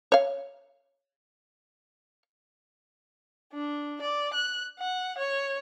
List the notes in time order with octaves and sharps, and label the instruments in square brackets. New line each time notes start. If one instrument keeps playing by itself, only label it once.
[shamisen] C#5 F5
[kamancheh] D4
D5
F#6
F#5
C#5